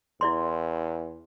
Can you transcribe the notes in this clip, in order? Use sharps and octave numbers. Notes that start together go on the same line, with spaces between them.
E2 E4 D5 C6